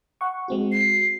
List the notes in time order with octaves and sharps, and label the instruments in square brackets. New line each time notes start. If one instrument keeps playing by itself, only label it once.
[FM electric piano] F#5 C#6
G#3 C4 F#4
[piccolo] C7